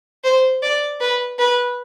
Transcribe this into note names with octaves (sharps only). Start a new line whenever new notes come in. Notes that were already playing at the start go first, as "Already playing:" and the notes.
C5
D5
B4
B4